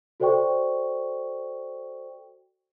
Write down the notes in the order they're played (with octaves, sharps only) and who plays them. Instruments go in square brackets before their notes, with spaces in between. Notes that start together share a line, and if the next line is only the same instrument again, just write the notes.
[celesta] F#4 A4 C5 D5 G5 C#6